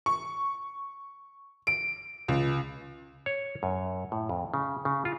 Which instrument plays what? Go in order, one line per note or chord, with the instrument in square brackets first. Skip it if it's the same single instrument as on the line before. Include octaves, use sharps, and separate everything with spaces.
[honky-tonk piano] C#6
D7
C#2
[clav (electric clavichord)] C#5
F#2
A2
F2
C#3
C#3
F4